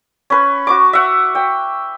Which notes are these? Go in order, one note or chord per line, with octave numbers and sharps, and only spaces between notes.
C#4 B4
F#4 C#6 D6
E5 F#5
G5